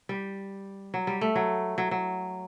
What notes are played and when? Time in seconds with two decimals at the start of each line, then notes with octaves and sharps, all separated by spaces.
0.09 G3
0.94 F#3
1.07 G3
1.21 A3
1.36 F#3
1.78 F#3
1.91 F#3